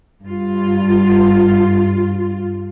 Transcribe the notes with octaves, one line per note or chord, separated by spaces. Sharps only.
G2 F4